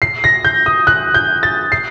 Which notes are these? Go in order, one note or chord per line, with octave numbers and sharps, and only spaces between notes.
C7
A#6
G6
D#6
F#6
G6
A6
C7